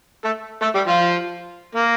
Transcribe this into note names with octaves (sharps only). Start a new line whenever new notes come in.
A3 A4
A3 A4
G3 G4
F3 F4
A#3